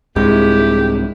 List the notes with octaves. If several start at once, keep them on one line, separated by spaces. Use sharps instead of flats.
C2 G#2 C3 G#3 E4 G4 G#4